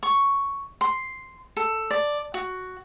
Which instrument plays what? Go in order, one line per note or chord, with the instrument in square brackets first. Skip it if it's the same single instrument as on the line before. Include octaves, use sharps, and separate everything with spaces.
[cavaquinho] C#6
C6
A4
D5
F#4